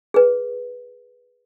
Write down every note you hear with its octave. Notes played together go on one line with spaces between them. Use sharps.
G#4 B4